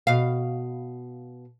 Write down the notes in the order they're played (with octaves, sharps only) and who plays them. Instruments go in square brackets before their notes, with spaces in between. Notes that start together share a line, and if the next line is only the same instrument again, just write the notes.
[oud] B2 F5